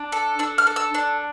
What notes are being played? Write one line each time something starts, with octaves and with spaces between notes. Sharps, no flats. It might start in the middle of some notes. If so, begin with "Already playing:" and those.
Already playing: D4
A4
D4 E6
F6
A4
E6
D4